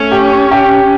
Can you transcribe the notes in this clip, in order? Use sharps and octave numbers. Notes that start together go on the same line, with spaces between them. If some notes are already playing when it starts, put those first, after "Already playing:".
Already playing: A3 C#4
G4
G4